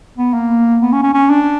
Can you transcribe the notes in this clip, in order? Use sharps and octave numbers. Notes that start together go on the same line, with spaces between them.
B3
A#3
B3
C#4
C#4
C#4
D4